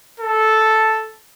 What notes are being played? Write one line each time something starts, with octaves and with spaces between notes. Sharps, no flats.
A4